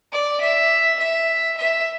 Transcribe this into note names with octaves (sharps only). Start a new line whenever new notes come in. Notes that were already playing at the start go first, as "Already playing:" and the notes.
D5
E5
E5
E5